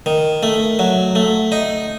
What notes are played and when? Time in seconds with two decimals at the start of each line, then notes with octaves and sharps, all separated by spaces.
0.06 D#3
0.43 A3
0.79 F#3
1.15 A3
1.52 D#4